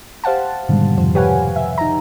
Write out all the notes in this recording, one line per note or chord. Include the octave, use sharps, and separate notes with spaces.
G4 C5 F5 F#5 A5
G#2 B2 D3 D#3 G3 G#3
F2 C3 F3 C5
G4 B4 C#5 F5 F#5 G#5
E5
D#4 A#5